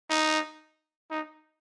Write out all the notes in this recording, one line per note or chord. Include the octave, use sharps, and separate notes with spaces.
D#4
D#4